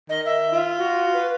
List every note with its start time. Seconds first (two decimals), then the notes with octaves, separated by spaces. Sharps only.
0.09 D#3 D#5
0.26 E5
0.53 F4
0.78 F#4
1.13 B4